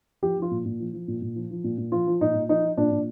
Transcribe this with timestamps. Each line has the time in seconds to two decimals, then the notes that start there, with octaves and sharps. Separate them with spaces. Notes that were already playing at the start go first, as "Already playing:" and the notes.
0.22 F3 G4
0.37 F3
0.42 F4
0.51 A#2
0.65 A#2
0.80 F3
0.93 F3
1.08 A#2
1.22 A#2
1.36 F3
1.51 F3
1.64 A#2
1.78 A#2
1.92 F3 F4
2.07 F3
2.21 A#2 D#4
2.35 A#2
2.49 F3 D#4
2.63 F3
2.77 A#2 D4
2.92 A#2